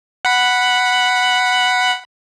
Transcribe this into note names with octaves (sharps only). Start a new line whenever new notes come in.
F#5 B5